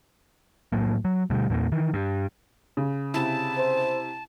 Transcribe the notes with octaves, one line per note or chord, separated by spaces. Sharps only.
A2 F#3 A#3
F#3
D2 B2 G3
E2 A#2 A#3
D#3 E3
G2
C#3
C3 E4 A5
C5